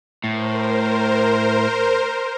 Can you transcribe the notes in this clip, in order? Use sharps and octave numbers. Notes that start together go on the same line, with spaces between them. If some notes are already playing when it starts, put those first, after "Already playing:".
A2 A#4 C5